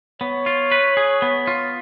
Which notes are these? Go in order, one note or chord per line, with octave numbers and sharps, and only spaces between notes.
B3 C#5
F4
B4
G#4
B3
F4